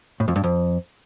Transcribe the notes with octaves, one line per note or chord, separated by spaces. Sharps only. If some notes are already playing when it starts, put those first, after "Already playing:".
A2
F2
G2
F2